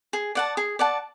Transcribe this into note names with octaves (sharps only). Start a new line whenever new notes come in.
G#4
D5 F#5 A5
G#4
D5 F#5 A5